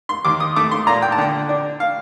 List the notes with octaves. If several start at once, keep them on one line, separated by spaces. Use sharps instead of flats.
C6
D#2 D6
D#6
A3 D6
C6
A#2 A#5
G5
A5
D3 G5
D4
F5